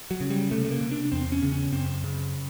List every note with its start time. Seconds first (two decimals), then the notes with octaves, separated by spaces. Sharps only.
0.11 F#3
0.21 C#3
0.30 G3
0.51 C3 A3
0.65 A3
0.71 A#3
0.81 C3
0.91 D4
1.12 E2 C4
1.32 C#4
1.42 C#3
1.52 C#4
1.72 F#2 C4
2.04 C#3